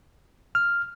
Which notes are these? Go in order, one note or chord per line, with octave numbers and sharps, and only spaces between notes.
F6